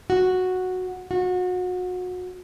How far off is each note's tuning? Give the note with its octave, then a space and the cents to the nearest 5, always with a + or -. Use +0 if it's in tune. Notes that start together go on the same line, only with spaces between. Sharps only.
F#4 -5
F#4 -30